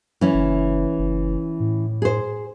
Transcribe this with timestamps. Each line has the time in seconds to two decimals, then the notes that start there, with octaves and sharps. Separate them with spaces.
0.21 E3 F#3 C#4
0.34 F#1
0.99 F#1
1.60 A2
2.02 G#4 C5